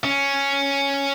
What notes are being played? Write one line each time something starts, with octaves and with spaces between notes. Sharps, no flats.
C#4